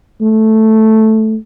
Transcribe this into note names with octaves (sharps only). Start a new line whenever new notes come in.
A3